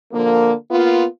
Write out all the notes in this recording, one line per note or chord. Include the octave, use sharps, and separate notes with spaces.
D3 F3 A#3
A#3 B3 F4